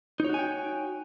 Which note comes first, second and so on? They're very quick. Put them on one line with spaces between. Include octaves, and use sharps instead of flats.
D#4 C#5 F#4 G#5 G5